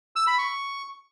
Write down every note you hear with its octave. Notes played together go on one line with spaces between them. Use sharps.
E6
B5
C#6